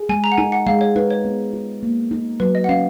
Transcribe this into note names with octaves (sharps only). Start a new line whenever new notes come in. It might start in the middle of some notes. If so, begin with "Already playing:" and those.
Already playing: G#4
G#3 G#5
A#5
F#5
D#4 G#5
F#5
G#3 F5
C#5
D#4 B4
C#5
B3
F4
A#3
D#4
F#3 B4
D#5
F#5
C#4 F5